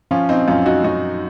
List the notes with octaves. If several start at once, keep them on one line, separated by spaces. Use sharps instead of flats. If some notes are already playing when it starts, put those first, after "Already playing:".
F3 C#4 F4
C4 D#4
F#2 C#4 F4
D#4 F#4
F#2 D#4 F#4